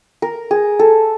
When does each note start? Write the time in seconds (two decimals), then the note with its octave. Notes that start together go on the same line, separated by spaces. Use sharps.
0.22 A#4
0.51 G#4
0.79 A4